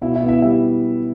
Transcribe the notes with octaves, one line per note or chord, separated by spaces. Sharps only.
B2 E4 E5
E4 E5
B3
E4 E5
G3 E4 E5